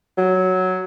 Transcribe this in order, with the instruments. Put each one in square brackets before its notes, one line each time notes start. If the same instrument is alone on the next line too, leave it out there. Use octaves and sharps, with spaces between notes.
[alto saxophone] F#3